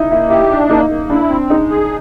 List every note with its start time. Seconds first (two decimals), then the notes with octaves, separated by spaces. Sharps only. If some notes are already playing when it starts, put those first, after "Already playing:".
Already playing: D#4 E4
0.11 A#3 E4
0.30 E4 G4
0.50 D4
0.70 A#3 D#4
0.90 A#3
1.10 D4 E4
1.29 C4
1.49 G#3 D#4
1.70 G#4